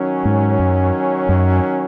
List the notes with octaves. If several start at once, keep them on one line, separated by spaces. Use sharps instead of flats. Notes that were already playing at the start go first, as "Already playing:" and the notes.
Already playing: D#3 F#3 C#4
G#2
F#2
F#2